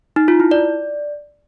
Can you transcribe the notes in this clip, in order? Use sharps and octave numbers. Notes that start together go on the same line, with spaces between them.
D#4
F4
E4
D5